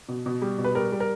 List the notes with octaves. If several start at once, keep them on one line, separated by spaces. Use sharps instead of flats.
B2
B2
G3
B2
B4
G3 A#4
G3
A#4